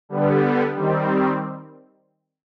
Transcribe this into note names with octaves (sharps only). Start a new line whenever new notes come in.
D3 G3 B3
D#3 G3 C4